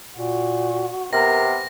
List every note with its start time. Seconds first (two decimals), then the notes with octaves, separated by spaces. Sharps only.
0.18 A#2 F#4
1.13 C3 B3 A#4 A#6